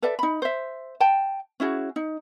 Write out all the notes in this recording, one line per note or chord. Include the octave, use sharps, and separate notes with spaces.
A4 B4 D5 E5
D#4 B5
C5 E5
G5 A5
C#4 E4 F#4 G#4
D#4